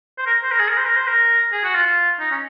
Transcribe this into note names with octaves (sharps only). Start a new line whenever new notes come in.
C5
A#4
C5
A#4
G#4
A#4
C5
A#4
C5
A#4
G#4
F#4
F4
F4
D#4
C#4